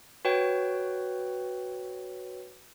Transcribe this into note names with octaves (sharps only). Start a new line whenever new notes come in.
F#4 B4 C#5 G5